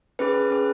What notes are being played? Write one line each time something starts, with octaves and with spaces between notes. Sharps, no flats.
C#4 G#4 B4
C#4 G#4